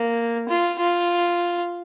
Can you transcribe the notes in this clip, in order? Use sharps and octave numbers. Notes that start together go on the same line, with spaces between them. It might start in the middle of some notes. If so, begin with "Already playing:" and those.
Already playing: A#3
F4
F4